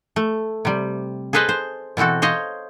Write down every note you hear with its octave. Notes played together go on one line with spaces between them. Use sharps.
A3
C3 G3
G#4 A4 B4 C5 D#5
C5
B2 E3 C4 F#4 A4
C5 C#5 D#5 F5